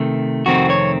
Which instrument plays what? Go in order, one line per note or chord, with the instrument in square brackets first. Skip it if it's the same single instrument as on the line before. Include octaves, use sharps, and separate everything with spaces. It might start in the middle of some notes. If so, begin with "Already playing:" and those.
Already playing: [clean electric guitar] C3 D#3 A3
F2 C3 D#3 A3 C4 F#4
C#5